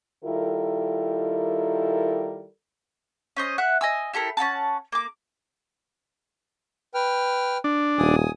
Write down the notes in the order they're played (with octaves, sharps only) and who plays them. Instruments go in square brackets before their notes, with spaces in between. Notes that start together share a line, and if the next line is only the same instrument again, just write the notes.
[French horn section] D#3 G3 E4 F4 A4 A#4
[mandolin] C#4 C5 D#5
E5 F#5 F#6
D#5 G#5 E6
E4 G4 A4 A#4
C#4 D#4 F#5 A5
A#3 D6
[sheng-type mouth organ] B4 G5 F6
[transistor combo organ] D4
[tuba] D#1 [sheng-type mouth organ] G#5 D#6